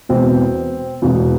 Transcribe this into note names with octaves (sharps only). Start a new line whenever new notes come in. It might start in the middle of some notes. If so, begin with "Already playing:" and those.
E1 E2 B2 C4
E1 E2 B2